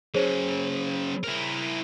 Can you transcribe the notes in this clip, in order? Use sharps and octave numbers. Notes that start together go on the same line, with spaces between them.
C#3 F#3 G#4 C5 C#5
E4 A#4